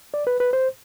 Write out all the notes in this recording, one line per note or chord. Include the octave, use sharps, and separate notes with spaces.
D5
B4
B4
C5